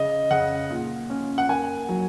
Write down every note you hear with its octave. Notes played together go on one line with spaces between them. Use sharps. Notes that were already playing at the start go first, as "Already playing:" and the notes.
Already playing: C#3 D#5
C#3 F#5
A#2
C#4
F#5
A#3 G#5
F#3